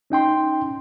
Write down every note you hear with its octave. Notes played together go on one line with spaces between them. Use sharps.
C#4 D#4 G5 C6